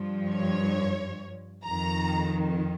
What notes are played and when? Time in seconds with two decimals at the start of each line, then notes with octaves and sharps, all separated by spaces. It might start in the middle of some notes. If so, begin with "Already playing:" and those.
Already playing: G2 F3
0.28 C#5
1.64 F2 D#3 A#5